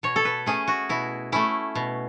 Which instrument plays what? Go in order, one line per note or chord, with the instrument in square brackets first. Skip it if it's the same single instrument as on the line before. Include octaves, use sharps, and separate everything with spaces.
[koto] B2 C#5
A4
B4
A3 C#4 G#4
F#4
B2 E4
A3 C#4 E4
B2